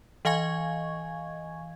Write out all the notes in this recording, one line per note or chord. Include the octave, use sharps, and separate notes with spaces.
E3 D#5 F5 G#5 C#6 G#6